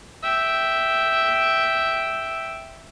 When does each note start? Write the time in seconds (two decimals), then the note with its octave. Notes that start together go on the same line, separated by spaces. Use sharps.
0.23 E5 G5